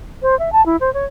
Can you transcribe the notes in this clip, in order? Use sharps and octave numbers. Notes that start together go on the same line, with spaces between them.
C5
E5
A5
E4
C5
C#5